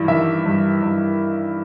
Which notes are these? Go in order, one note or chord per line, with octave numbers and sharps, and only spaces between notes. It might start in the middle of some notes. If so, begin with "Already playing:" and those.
Already playing: G2 E3
D#3 E5
G2
G2